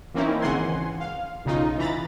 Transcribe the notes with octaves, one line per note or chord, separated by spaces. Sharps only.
E3 A#3 C4 C#4 D#4 E4
G#1 C#3 E3 F#5 G#5 C6
F5
B1 C#3 D#4 F4
E3 A#5 B5 A6